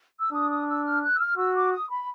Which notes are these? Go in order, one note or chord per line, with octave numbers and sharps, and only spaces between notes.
E6
D4 D#6
D#6
E6
F6
F#6
E6
F6
F#4 E6
D6
D#6
B5